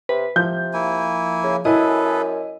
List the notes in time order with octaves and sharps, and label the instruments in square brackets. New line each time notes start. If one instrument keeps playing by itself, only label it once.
[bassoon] C3 [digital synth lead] B4
[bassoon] C3 [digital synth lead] F3 [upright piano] G6
[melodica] A#3 E4 G#5
[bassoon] C#3
[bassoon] F#2 [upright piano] E4 [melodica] G#4 A4 B4 [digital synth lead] D#5